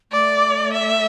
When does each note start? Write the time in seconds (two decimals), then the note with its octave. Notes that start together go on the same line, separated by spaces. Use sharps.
0.11 A3 D5
0.73 E5